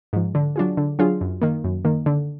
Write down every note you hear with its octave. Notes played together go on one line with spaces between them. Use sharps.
G#2 F3
D3
F#3 D4 F4 G#4
D3
F#3 D4 F4 G#4
F#2
D#3 A#3
F#2
D#3 A#3
D3